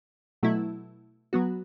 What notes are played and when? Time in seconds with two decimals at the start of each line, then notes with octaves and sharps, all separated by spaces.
0.43 B2 F#3 A3 E4
1.33 F#3 B3 F#4